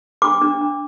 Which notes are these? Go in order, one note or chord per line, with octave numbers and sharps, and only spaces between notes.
D4 D6
D4
D4